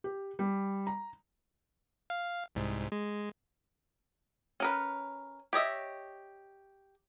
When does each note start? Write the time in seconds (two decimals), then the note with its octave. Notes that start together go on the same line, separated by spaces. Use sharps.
0.04 G4
0.39 G3
0.87 A#5
2.10 F5
2.55 C2 G#2
2.92 G#3
4.60 C#4 A#4 B4
5.53 G4 C#5 D#5 E5